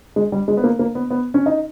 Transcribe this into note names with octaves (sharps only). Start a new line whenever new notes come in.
G#3
G3
G#3
B3
A#3
A#3
B3
B3
C#4
D#4